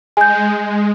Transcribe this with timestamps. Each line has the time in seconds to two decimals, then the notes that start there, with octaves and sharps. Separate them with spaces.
0.17 G#3 G#5 G6